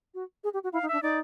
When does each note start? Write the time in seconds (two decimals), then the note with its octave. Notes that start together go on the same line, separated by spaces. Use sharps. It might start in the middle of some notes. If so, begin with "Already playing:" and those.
0.14 F#4
0.44 G#4
0.54 G4
0.64 F#4
0.73 E4 F5
0.83 D#4
0.88 D4 E5
1.02 D#4 D5